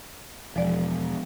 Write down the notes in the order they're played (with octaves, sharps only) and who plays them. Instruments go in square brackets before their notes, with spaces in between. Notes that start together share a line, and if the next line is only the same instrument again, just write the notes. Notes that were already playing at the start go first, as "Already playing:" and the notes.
[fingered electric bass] E1 [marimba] F3 G#3 D5